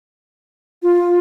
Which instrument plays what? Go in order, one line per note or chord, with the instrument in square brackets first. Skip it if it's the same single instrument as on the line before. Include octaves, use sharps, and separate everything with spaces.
[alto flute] F4